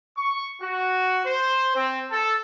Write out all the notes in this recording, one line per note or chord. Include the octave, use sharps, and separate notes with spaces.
C#6
F#4
C5
C4
A4